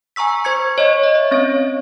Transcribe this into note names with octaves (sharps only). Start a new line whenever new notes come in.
G#5 A#5 C#6 E6 B6
C5 C#6 G#6 C#7
C#5 D#5 C#6
D#5
E5
C4 C#4 C#5